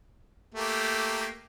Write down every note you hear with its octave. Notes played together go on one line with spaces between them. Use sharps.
A3 A#3 G4